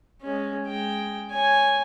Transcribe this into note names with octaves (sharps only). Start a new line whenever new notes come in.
G#3 C#4
G#3 G5
C#5 G#5